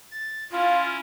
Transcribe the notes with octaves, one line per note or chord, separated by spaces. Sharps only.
A6
C#4 E4 F4